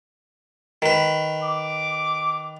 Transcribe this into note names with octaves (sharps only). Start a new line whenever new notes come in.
D#3 B4
D6